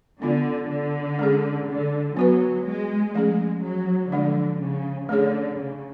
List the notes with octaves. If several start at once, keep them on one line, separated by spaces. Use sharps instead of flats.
D3 B3 D4 F4
D3
G#3 C#4 G#4
D3
F#3 B3 F#4 B4
G#3
F3 G#3 A3 C#4 G#4
F#3
D3 F3 G#3 D4
C#3
D3 A3 C#4 G#4 C#5
C#3